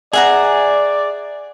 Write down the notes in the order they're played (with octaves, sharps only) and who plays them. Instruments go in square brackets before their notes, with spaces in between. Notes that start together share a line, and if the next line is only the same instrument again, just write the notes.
[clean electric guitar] G#4 [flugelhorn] D5 [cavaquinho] E5 F#5 A#5